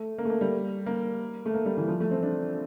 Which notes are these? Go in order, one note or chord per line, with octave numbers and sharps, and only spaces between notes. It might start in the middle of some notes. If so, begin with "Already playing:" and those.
Already playing: A3
A#3
A3
A#3
G3
A#3
A3
A#3
G3
E3
F3
A3
C4
D4